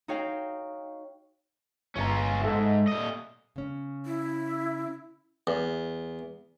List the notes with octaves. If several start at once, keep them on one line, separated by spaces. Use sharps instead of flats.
D#4 F#4 C#5 F5 G5
G1 C#4 F4 A#5
D#2 G#2 A4 E5
A#2 D#5
C#3 C#4
E4
E2